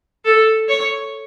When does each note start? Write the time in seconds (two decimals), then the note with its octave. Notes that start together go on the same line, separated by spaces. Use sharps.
0.25 A4
0.69 C#5